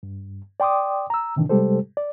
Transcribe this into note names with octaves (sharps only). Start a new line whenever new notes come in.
G2
D5 G5 C6 D6 D#6
A#5 E6
A2 C3 D#3 E3 D4
C3 G3 G#3 G4 A4 C5
D5